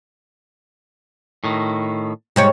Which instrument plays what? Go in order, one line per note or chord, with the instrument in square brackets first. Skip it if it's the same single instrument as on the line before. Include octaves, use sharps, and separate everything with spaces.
[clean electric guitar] A2 D#3
[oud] G#2 G3 C#5